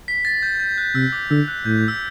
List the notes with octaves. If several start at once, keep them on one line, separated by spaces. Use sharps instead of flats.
B6
A6
G6
G6
F#6
C3 E6
D6
D3 E6
F#6
A2 G6
E6